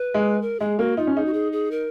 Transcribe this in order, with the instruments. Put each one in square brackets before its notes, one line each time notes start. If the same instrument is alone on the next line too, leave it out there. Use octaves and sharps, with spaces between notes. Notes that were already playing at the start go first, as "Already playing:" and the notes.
Already playing: [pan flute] B4
[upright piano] G#3
[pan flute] A#4
[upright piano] G#3 [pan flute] G#4
[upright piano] A#3 [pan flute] F#4
[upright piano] D#4 [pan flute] F4
[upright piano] C#4
[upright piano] D#4 [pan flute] G#4
[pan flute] F#4
G#4
G#4
A#4